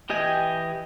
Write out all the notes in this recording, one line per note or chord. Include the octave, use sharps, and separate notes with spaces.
E3 G4 D#5 G5 G#5